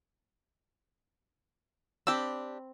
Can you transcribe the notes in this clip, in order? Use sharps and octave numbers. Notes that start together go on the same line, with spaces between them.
C4 D4 G4 B5 E6